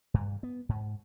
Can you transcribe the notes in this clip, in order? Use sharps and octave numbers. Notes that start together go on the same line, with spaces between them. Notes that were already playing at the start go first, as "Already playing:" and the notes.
G2
B3
G#2